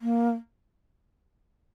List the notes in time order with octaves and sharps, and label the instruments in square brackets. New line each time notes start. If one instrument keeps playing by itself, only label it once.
[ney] A#3